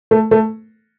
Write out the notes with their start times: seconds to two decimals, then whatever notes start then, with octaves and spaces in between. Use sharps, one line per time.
0.11 A3
0.31 A3